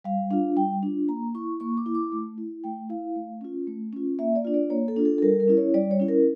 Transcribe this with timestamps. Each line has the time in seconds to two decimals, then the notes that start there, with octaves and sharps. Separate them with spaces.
0.04 G3 F5
0.31 D4 F4 F5
0.56 G3 G5
0.83 D4 F4
1.08 A#3 A#5
1.35 E4 C#6
1.60 A#3 C#6
1.77 D6
1.86 E4
1.95 D6
2.12 A3
2.38 E4
2.64 A3 G5
2.90 E4 F5
3.16 A3
3.41 C#4 F4
3.67 A3
3.93 C#4 F4
4.19 A#3 E5
4.36 D5
4.45 D4 F4
4.54 D5
4.70 A#3 C#5
4.88 A4
4.96 D4 F4
5.05 A4
5.18 A4
5.22 G3 A#4
5.40 A#4
5.48 C#4 E4
5.57 C#5
5.74 G3 D5
5.91 C#5
6.00 C#4 E4
6.08 A#4